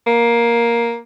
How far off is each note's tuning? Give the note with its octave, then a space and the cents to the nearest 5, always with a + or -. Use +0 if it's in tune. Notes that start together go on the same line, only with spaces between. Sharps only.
A#3 +10